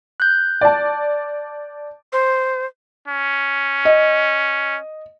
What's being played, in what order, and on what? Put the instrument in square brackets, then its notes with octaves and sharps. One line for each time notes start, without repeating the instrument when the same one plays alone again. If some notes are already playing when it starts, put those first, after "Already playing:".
[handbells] F#6 G6
[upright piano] D5 A5
[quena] C5
[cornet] C#4
[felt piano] D#5